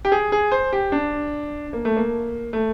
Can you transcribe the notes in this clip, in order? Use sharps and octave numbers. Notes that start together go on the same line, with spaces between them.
G4
G#4
G#4
C5
G4
D4
A#3
A3
A#3
A3